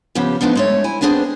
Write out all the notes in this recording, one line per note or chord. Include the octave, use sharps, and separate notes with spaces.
C#3 F3 B3 G4
F3 A3 B3 D4 D#4
G#3 A3 C#5
E4 G#5
B3 C4 D4 G#4 B4 C5